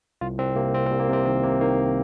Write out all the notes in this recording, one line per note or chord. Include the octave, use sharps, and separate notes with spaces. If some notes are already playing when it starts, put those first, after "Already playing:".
C2 F4
C2 C4
C3 A#3
C2 C4
C4
C2
A#3
C3 C4
D#3 C4
C3 A#3
D#3 A#3